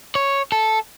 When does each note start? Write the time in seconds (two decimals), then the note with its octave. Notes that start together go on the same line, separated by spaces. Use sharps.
0.15 C#5
0.52 A4